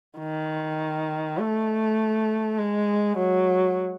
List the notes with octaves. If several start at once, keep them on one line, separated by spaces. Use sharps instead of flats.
D#3
A3
G#3
F#3